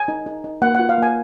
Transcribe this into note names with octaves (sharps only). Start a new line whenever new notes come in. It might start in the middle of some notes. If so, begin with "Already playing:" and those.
Already playing: G#5
D#4
D#4
D#4
A#3 F#5
F4 F#5
F5
A#3 G#5